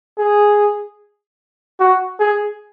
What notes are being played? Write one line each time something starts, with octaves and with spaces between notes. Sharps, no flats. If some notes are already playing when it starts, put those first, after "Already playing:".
G#4
F#4
G#4